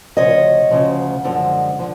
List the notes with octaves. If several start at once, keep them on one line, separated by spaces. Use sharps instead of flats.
D2 C#3 F3 C#5 D#5
D2 C#3 F3
F#2 D3 F3 G#3
D3 F3